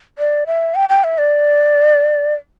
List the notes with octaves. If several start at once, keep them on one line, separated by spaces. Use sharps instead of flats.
D5
E5
G5
G5
E5
D5